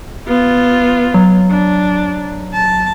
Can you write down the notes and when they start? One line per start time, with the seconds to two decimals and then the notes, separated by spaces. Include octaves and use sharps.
0.27 B3 F4
1.14 F#3
1.50 D4
2.53 A5